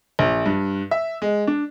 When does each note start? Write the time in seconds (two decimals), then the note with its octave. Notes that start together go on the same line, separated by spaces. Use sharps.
0.19 A#1
0.46 G2
0.91 E5
1.22 G#3
1.47 D4